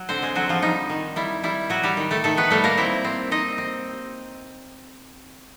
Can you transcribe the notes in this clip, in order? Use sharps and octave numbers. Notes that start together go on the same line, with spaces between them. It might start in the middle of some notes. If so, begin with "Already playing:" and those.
Already playing: F#3
D3 C4 C5
G#3 G#4
D3 F#3 F#4
F3 F4
G3 D#4
D#3
G3 E4
G3 E4
F#3 G3 F#4
G3 G4
D#3
A3 A4
D#3 A3 A4
B3 B4
G3 A3 A4
A#3 A#4
C4 E4 E5
C4
C4 D#4 D#5
C4